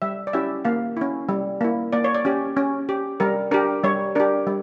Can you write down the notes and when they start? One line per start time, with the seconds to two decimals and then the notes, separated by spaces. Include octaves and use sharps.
0.02 G3 E5
0.27 D5
0.33 C#4 E4 G4 E5
0.65 A#3 F5
0.97 C#4 E4
1.29 G3
1.61 A#3 E4
1.93 A#3 D5
2.04 C#5
2.15 D5
2.25 C#4 G4
2.57 C#4
2.89 G4
3.20 G3 A#4
3.51 D4 G4 A#4
3.84 G3 C#5
4.15 D4 G4 A#4
4.47 G3